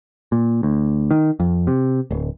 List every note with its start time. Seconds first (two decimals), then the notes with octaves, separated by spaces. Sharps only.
0.32 A#2
0.63 D2
1.11 D#3
1.40 F2
1.67 C3
2.11 D1